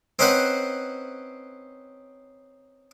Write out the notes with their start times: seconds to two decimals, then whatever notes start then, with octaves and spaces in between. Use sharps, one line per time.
0.19 C4 C#4 D#4 B4 C5 F#5